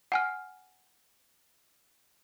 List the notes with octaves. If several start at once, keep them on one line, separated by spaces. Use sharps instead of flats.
F#5 G#5 F6